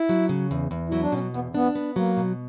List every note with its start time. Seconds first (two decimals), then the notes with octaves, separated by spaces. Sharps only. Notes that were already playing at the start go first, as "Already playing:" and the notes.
Already playing: E4
0.09 F#3
0.29 C#3
0.51 E2
0.71 E2
0.89 F#3 E4
1.02 D4
1.12 B2 C#4
1.33 E2 B3
1.54 B3 D4
1.75 B3
1.96 F#3 A#3
2.17 B2